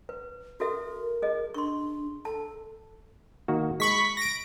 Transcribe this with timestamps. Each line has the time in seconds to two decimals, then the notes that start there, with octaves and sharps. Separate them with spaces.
0.09 B4
0.60 F#4 A4 A#4 E5
1.22 G#4 D#5
1.54 D4 C6 C#6
2.25 A4 A5
3.48 D#3 A#3 F#4
3.80 G#3 B5 C#6 B6
4.17 A#6 D7